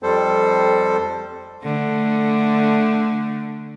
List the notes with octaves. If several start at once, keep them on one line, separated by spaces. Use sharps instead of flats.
F2 G3 A4 C5
D3 A3